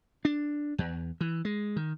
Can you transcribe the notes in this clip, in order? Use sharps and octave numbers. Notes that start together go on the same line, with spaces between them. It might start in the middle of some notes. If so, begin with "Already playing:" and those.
D4
E2
E3
G#3
D#3